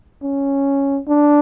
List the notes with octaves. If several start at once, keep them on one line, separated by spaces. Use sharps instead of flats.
C#4
D4